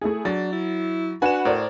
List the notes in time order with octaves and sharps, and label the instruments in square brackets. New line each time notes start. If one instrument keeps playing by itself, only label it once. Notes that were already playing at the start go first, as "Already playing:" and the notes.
[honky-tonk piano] A3 E4 G#4
[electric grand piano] F#3 [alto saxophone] D4 [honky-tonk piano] A6
[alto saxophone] E4
[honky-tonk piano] D4 B4 F#5 [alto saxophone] F#4 [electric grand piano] G#5 E7
[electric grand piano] A2 [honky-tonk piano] A#4 C5 D5